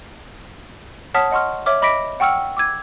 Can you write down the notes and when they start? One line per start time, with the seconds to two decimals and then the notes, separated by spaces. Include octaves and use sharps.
1.14 C#5 F#5 A5 D#6 F6 B6
1.31 D#5 F#5 C6 C#6 F6
1.66 C#5 E5 D6 F6
1.82 D#5 B5 D6 A#6 B6 D7
2.20 F#5 G5 C#6 E6 F6 C#7
2.57 D6 E6 G#6